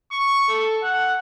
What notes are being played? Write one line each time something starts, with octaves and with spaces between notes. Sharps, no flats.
C#6
A4
F#5